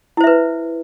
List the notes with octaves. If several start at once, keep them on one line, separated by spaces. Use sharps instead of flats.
E4 B4 C5 E5